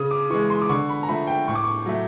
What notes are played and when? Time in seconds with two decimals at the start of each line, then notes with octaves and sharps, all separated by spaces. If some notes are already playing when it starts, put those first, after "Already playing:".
Already playing: C#3 D#6
0.11 D6
0.30 E3 G#3 C#6
0.50 C6
0.62 D6
0.69 D3 C#6
0.89 B5
1.03 A#5
1.09 F3 A3 B5
1.27 G5
1.48 A2 C#6
1.55 D6
1.64 C#6
1.86 F#3 A3